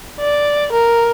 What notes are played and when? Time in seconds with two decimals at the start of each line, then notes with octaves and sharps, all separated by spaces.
0.19 D5
0.72 A#4